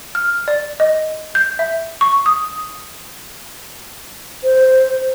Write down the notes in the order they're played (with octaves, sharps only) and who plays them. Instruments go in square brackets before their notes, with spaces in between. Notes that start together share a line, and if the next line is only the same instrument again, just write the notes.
[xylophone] F6
D5
D#5
G6
E5
C#6
D#6
[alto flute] C5